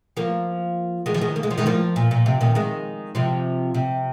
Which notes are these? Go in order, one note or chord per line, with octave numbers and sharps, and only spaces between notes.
F3 A#3
D#3 G#3
F3
D#3 G#3
A#3
G#3
F3
D#3 G#3
F3 A#3
A#2
A#2
C3
A#2 D#3
D#3 G#3
C3 F3
C3